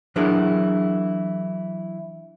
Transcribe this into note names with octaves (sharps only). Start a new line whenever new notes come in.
E3 F#3 D4 E4 G#4 A#4